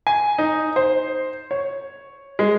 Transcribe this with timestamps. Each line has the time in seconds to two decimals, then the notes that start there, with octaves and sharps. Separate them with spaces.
0.07 G#5
0.38 D#4
0.76 C5
1.51 C#5
2.39 G#3